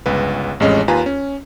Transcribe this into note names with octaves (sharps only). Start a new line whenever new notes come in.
G1 C#2 B4
A1 F2 G#3 C#4 D#5
D#2 F4 B4 G#5 A#5
C#4